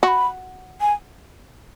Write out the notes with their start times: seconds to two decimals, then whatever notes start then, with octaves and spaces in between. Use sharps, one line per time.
0.03 F#4 C#6
0.08 B5
0.81 G#5